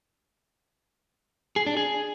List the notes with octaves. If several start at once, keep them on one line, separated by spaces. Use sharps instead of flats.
G#4
D4
G#4